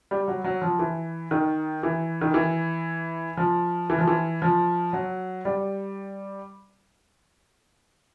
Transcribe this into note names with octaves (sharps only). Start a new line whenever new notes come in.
G3
F#3
F#3
F3
E3
D#3
E3
D#3
E3
F3
E3
F3
E3
F3
F#3
G3